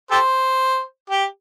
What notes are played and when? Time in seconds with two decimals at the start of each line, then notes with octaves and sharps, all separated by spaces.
0.11 G4 A4 C5
1.10 G4